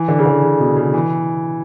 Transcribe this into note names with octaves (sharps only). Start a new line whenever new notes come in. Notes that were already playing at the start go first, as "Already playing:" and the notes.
Already playing: E3
D3
C#3
D3
C#3
B2
C#3
E3